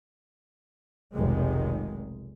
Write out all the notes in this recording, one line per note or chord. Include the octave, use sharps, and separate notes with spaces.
F1 B1 D#3 G#3